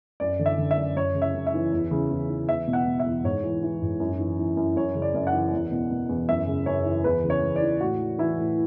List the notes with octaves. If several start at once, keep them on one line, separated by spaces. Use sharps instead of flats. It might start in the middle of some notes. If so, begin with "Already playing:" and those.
F#2 D5
D3
E5
D3
E5
F#2
F#2 C#5
C#3
E5
F#2
E5
E3
E2
C#3
E2
E3
E2 E5
B2
F#5
B2
E5
E2
G#2 C#5
E3
E3
G#2
F#2
E3
E3
F#2
F#2 C#5
C#3
D5
F#2
F#5
E3
E2
B2
B2
E2
F#2 E5
C#3
F#2 C#5
E3
E2 B4
C#3
C#5
E2
D5
E3
A2 F#4
E3
E3 E4
A2